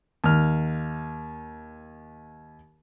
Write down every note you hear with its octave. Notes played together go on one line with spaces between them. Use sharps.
D#2 F6